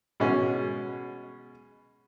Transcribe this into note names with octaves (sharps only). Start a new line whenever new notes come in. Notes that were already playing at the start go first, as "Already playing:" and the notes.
B2 G#3 C#4